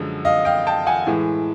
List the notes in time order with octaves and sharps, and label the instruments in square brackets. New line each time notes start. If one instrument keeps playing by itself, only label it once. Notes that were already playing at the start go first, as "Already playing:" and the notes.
Already playing: [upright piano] F#2 D3 F3 G#3
D#5 F5
F5 G5
G5 A5
F#5 G#5
A2 E3 G#3